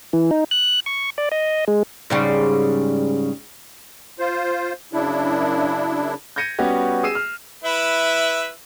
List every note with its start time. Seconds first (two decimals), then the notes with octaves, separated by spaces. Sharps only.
0.13 E3
0.31 D#4
0.51 F#6
0.86 C#6
1.18 D5
1.32 D#5
1.68 G#3
2.10 G#2 C#3 G3
4.19 F4 C5
4.93 F#2 C#3 D4 E4
6.36 G6 G#6 A#6 C#7 D#7
6.59 G3 B3 C#4 F#4 G4
7.03 G#4 E6 C7 D#7 E7
7.15 F6
7.64 E4 B4 E5